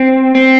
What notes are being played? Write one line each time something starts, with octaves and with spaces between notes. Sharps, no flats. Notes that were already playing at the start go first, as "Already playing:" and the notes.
Already playing: C4
C4